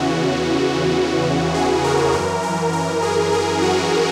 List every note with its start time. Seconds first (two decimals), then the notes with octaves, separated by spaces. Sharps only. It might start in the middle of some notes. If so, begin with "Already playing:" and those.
Already playing: E2 C#3 E3 F#4
1.54 G#4
1.84 A#4
2.13 F#2 E3 A#4
2.43 A#4
2.73 A#4
3.02 G#4
3.33 G#4
3.62 F#4